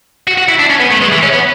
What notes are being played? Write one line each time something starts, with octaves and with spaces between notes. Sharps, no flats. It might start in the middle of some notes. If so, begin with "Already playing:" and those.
F#4
F#4
E4
D4
C#4
B3
A3
G#3
E3
C#4
B3